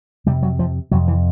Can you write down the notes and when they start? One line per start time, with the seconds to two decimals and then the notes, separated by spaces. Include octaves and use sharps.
0.26 F2 C3 G3
0.43 F#3
0.59 F3
0.91 F2 C3 F#3
1.08 E3